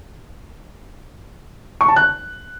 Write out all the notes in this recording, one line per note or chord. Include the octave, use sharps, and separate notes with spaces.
C#6
A5
F#6